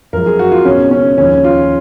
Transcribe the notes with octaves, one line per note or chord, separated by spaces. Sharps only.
F#2 F3 G#3 A#4
G#4
F#4
F4
C#2 B2 G#3 C#4
C#4
D#2 C#3 F3 C#4
F4